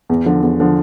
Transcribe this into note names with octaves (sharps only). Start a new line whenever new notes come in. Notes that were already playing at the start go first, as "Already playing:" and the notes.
E2
D3 F3
E2
D3 F3